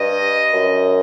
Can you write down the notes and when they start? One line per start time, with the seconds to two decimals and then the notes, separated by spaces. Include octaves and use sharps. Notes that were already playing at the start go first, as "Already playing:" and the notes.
Already playing: G2 D#5
0.53 F#2